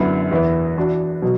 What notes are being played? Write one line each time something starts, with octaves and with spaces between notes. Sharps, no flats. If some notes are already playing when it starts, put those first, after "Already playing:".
Already playing: F#2 D3 B3 E4
E2 E3 B3 E4
E3 D4 F#4
B2 F#3